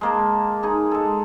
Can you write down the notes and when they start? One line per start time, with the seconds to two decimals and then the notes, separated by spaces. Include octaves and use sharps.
0.01 G#3 A#3 A5
0.63 D#4 G#4
0.92 G#3 A4